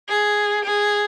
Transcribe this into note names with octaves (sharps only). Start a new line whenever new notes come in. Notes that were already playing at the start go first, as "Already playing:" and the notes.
G#4
G#4